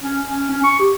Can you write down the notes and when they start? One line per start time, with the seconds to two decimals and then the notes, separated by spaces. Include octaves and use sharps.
0.02 C#4
0.26 C#4
0.50 C#4
0.64 C#6
0.79 G4